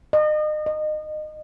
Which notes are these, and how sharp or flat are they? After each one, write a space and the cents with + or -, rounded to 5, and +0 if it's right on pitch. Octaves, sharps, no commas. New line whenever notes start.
D#5 -35
D#5 -25